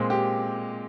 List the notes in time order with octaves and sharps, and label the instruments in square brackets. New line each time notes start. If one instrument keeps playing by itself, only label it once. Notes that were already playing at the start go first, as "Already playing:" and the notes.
Already playing: [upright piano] A#2 G#3 C4
G4